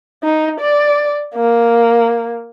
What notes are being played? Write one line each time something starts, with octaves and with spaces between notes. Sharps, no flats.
D#4
D5
A#3